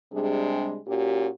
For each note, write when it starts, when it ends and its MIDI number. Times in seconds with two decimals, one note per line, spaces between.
0.12 0.78 48
0.12 0.78 55
0.12 0.78 56
0.12 0.78 62
0.12 0.78 68
0.86 1.28 46
0.86 1.28 61
0.86 1.28 66
0.86 1.28 67